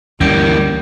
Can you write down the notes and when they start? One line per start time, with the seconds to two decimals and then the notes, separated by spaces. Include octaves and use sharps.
0.21 D2 E3 G3 A#3 C#4 G6 D7